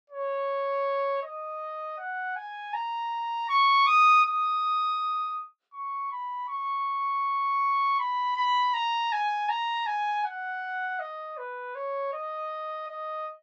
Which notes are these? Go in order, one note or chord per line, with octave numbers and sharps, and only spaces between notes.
C#5
D#5
F#5
G#5
A#5
C#6
D#6
D#6
C#6
B5
C#6
B5
B5
A#5
G#5
A#5
G#5
F#5
D#5
B4
C#5
D#5
D#5